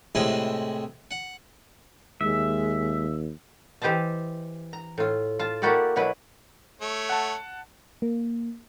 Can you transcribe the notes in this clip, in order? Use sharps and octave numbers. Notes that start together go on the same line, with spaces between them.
A2 C3 G#3 E4 G#4 B5
F#5
D#2 G#3 E5
E3 G4 C5 D#5 A5
A#5
A2 F4
F4 A5
A#3 E4 F#4 G4 A4 D5
B2 F#3 E4 B4
A3 C#5
F#5 A5
A#3